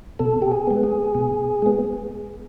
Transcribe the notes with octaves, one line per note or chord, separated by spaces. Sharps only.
B2 A4
G4
G#4
G#3 B3
G#4
B2
G#3 B3